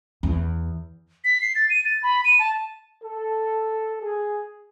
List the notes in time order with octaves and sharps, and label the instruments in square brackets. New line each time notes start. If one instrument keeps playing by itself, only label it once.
[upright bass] E2
[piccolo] B6
C7
A6
D#7
A6
B5
D#7
A5
[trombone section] A4
G#4